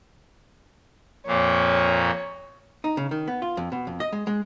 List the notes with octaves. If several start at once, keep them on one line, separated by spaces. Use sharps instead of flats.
F2 A#2 A#3 C#5
D#4
C#3
D#3
B3
F4
F2
B2
F2
D#5
G#3
G#3